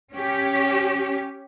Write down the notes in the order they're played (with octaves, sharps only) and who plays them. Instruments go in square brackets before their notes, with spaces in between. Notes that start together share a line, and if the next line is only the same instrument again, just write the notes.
[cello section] C#4 G4